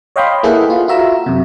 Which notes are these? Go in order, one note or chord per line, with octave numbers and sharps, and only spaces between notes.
C#5 D#5 F5 G5 B5 C6
A#3 E4 G#4 A4 B4 F#5
F4
F4 F#4 E5 A#5 E6
F#2 C3